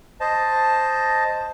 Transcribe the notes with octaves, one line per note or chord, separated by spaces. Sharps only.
C5 D#5 A5